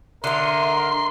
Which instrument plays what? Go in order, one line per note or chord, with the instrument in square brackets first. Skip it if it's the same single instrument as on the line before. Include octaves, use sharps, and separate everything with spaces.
[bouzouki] D3 D#4 [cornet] A#4 [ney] E5 [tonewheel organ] C6